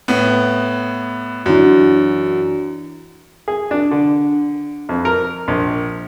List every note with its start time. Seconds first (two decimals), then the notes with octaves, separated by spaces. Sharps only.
0.08 A2 B3
1.46 F#2 E3 D4 F#4
3.48 G#4
3.71 D4
3.91 D3
4.89 F2
5.05 A#4
5.48 A#1